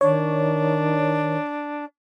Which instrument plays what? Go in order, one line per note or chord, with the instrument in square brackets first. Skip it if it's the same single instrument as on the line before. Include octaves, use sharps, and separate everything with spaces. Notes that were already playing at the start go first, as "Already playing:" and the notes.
[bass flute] D#3 [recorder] D4 [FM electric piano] C#5